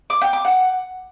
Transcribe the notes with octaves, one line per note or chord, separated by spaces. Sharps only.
D6
G5
D6
F#5